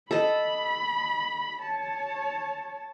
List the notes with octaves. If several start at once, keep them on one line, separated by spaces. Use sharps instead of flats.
A4 D#5 B5
C#5 A5